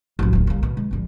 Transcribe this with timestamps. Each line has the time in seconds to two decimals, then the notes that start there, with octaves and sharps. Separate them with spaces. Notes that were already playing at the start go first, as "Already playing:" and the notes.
0.19 A1 F#3
0.33 D1 D#2
0.47 C2 A#3
0.63 B2
0.77 G#3
0.91 F1 A#1